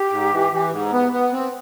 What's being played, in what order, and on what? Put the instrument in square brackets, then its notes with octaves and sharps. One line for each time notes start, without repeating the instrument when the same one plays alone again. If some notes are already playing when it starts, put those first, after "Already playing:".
Already playing: [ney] G4
[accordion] G#2
E3
E3
G#2
B3
B3
C4